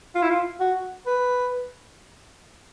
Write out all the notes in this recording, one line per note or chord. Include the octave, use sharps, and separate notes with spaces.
F4
E4
F4
F#4
B4